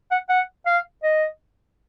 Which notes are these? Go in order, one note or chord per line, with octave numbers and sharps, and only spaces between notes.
F#5
F#5
F5
D#5